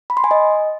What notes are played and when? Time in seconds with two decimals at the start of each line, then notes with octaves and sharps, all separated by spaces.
0.10 B5
0.17 C6
0.24 G#5
0.31 D#5